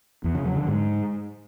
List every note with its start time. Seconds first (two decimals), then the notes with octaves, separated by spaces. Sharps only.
0.24 E2
0.35 C#3
0.46 F#3
0.56 D3
0.67 G#2